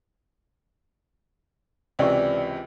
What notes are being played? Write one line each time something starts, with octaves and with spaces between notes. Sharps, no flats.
C#2 C3 E3 D5 C#6